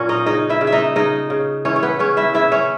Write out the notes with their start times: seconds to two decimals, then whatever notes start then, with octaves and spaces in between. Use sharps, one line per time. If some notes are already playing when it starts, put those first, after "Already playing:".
Already playing: A#2 F#3 A#3 C#4 A#4 C#5
0.09 D#4 D#5
0.26 C#3 D#4 D#5
0.50 E4 E5
0.61 C#3
0.67 E5
0.72 D#4 D#5
0.96 C#3 D#4 D#5
1.30 C#3
1.65 E3 C#4 C#5
1.76 C#5
1.83 B3 B4
1.99 C#3 C#4 C#5
2.17 E4 E5
2.34 C#3 E4 E5
2.52 C#4 C#5